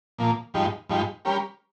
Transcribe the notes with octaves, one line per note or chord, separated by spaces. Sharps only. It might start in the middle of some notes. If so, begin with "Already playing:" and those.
A#2 F3 A#3
G2 F3 G#3 D#4 G4
G2 F3 G#3 D#4 G4
G3 C#4 G4 A#4